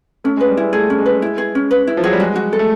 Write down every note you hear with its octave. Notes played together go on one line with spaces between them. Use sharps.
A3 C#4
G#3
B4
G3
G#3 E4
A3 G#4
C#4
G#3
B4
E4
G#4
C#4
B4
E4
F3
F#3 G#4
G3
G#3 F#4
F#4
A4
A3